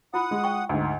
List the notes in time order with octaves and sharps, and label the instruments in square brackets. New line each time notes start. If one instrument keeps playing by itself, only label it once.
[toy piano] E4 F4 [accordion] F#5 D#6
[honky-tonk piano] G#3
[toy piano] G5 C#6
[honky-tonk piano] D2 G#2